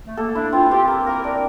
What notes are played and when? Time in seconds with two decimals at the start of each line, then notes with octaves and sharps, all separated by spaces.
0.07 A3
0.17 A#3 A4
0.35 D4 E4
0.53 C4 F4
0.71 C4 G4
0.88 A#3
1.06 A#3 A#4
1.23 D4 A#4